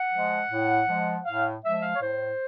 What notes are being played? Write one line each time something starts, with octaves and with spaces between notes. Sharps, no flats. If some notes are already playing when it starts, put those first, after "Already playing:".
Already playing: F#5
F3 G#3
A2
F3 G#3
A2 F5
F3 G#3 E5
F5
C#5
A2 C5